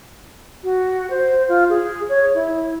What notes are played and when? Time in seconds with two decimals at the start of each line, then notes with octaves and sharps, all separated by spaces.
0.64 F#4
1.10 C5
1.49 F4
1.70 G#4
2.09 C#5
2.35 E4